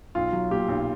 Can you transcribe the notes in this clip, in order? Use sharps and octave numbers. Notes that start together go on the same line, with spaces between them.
B1 F4
F#3
A#2 G4
B1